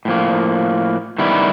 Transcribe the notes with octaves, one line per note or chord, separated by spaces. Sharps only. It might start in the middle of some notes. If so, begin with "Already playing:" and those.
A2 F3 A#3
D#3 G3 B3 E4